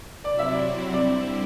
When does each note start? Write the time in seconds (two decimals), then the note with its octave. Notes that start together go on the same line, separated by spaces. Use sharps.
0.24 C3 F#3 C4 E4 D5
0.39 E5
0.52 D5
0.93 D3 G3 C4 E4 D5